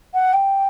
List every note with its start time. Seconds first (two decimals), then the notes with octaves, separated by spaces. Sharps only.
0.14 F#5
0.33 G5